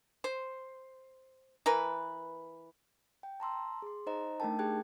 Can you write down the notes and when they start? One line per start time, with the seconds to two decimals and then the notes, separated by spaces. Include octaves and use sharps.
0.24 C5
1.66 E3 A#4 B4
3.23 G5
3.40 A5 A#5 C6 E6
3.82 G#4 C6
4.06 D#4 C5 D#5 A#5
4.40 A3 D4 D#4 A#4 G5 A5
4.59 G4 G#4 G5 F#6 G#6